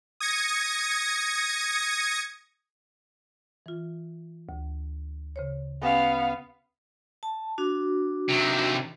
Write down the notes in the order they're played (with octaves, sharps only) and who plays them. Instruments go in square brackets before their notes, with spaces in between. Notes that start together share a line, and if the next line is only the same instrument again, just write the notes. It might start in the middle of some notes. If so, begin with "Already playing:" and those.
[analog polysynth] D#6 G#6 A#6 C#7
[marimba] E3 F4
D2
C#3 C5 C#5
[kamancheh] B3 F5 [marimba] C#4 G4 G#5
[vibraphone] A5
D4 F#4
[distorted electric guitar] C3 D#3